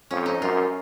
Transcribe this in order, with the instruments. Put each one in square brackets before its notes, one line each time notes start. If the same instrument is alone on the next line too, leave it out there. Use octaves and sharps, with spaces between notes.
[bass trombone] F2 [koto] C#4
[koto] D#4
[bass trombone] F#2 [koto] F4